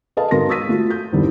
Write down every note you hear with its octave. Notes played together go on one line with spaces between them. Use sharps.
G#4 A4 B4 D#5 F5 A5
G#2 B3 F#4 A#4 C6 A#6
C#6 D#6 E6 A6 B6 D#7
A3 F4 F#4
G6
G#1 E2 G2 E3